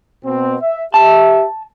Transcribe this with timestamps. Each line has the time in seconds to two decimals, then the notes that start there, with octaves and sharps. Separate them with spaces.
0.25 B2 C4
0.61 E5
0.94 G4 E5 A5